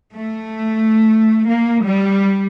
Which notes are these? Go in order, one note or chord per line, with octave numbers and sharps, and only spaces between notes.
A3
A#3
G3